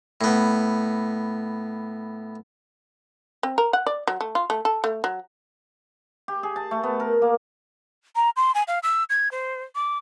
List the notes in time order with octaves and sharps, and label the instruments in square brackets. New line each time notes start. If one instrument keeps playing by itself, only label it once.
[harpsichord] A2 B3
[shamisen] C4
A#4
F#5
D5
F#3
A3
F4
A3
A4
A3
F#3
[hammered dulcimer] G4
G#4
A5
A3
B3
A#4
A#3
[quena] A#5
C6
G#5
F5
E6
G#6
C5
D6